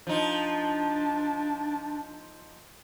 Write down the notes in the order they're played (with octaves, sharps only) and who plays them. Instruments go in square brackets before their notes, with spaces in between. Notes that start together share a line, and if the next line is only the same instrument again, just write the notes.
[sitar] F3 D#4 [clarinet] D4